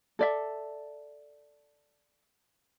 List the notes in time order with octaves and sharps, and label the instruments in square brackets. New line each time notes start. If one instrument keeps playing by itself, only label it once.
[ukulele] A4 D5 E5